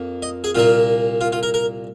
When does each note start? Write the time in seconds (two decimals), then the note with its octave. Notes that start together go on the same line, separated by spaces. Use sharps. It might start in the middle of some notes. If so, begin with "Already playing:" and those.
Already playing: F2 A#3
0.23 D#5
0.44 G#4
0.55 C2 A#2 A#3 F4
1.21 F4
1.32 F4
1.43 A#4
1.54 A#4